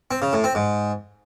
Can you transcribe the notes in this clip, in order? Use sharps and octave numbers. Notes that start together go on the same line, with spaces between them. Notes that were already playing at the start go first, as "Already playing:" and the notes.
C4
C#3
A2
C4
G#2